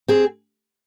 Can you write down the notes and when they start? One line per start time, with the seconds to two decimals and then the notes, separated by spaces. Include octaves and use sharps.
0.08 C4 G#4